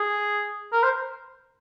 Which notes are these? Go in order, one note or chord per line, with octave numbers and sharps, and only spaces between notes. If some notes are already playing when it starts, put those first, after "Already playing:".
Already playing: G#4
A#4
C5